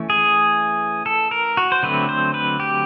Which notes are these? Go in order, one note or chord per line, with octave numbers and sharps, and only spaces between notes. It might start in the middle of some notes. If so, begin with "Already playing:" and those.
Already playing: E3 A3 C#4
G#4
A4
A#4
F#4
C5
D3 F#3 A3 C4 B4
C5
B4
G4